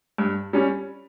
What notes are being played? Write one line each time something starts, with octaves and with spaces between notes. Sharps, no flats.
G2
G3 C#4